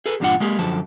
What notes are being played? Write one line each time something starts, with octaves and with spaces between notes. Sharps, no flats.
G#4 A4 B4
E2 G2 A#2 D4 F4 F#5
G#3 A#3 G4 G#4
F#2 D3 F3 A5